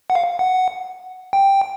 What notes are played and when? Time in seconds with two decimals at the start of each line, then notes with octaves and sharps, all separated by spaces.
0.10 F#5
0.15 F5
0.39 F#5
1.33 G5